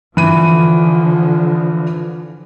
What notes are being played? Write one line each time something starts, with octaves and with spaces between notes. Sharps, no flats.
D3 E3 F3 D#7